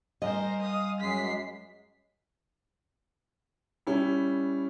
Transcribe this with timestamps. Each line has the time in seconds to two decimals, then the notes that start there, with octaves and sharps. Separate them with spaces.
0.22 G3 A#4 C5 D#5 G#5 C6
0.61 F5 D#6
1.00 F#2 G#3 B6 C7
3.87 G3 C#4 E4